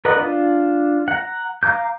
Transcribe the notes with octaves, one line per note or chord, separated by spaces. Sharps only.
A#4 B4 D5 D#5 F#5
D4 F4
F#5 A#5
F5 A#5 D6 G6